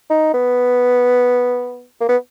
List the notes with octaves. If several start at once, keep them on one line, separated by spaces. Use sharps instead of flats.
D#4
B3
A#3
B3